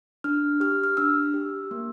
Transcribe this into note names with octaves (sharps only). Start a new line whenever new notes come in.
D4 F6
G4 F6
F6
D4 E6
G4
A#3